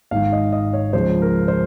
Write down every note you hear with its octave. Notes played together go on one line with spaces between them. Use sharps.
G#1 G#2 D#3 F5
D#5
D#5
C#5
C#2 C#3 F3 C5
A#4
C5